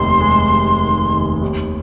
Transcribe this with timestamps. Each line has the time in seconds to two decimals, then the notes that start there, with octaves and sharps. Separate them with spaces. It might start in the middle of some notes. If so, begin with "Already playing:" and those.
Already playing: F1 D#2 C6
0.21 G#3
0.51 D#2
0.82 D#3
1.11 D#2
1.42 D#2